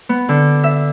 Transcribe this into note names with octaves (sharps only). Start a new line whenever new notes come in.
B3
D3
E5